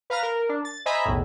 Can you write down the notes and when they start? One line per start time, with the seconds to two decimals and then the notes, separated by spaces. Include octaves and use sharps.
0.10 B4 F5 A#5 F6
0.23 A#4
0.49 D4
0.65 A6
0.86 C5 D#5 E5 G#5 A#5 B5
1.05 B1 E2 A2